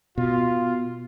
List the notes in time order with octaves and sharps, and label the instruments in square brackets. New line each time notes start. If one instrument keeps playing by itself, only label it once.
[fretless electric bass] B2 [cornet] F4